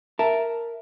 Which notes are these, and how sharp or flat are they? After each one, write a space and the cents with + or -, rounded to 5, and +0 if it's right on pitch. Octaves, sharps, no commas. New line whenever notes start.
A#4 +0 E5 +0 A5 +0